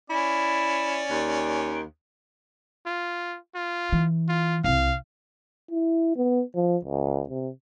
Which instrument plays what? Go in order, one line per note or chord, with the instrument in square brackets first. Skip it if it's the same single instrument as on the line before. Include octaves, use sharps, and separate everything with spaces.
[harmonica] C#4 D5 [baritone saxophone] E4
[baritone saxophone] D#2
[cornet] F4
F4
[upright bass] E3
[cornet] F4
[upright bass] C2 C3 [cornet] F5
[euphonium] E4
B3
F3
C#2
C3